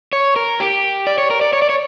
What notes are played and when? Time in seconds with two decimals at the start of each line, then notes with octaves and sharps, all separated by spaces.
0.13 C#5
0.36 A#4
0.60 G4
1.07 D5
1.18 C#5
1.30 A#4
1.41 D5
1.53 C#5
1.62 D5
1.69 C#5